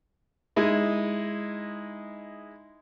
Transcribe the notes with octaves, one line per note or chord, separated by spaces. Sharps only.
G#3 D#4 E4